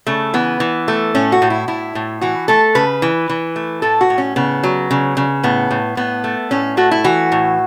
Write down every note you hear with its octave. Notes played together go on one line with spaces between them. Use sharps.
C#3 A3
E3 B3
E3
A3
A2 C#4
F#4
A2
E4
A2 E4
A2
E3 F#4
A3 A4
C#3 B4
E3
E3
A3
A2 A4
F#4
A2
C#4
C#3 B3
F#3
C#3
C#3
A2 B3
A2
A2 B3
A3
A2 C#4
A3 F#4
E4
E3 F#4
A2